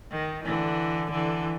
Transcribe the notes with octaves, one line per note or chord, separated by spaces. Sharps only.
D#3
D3 E3
D3 E3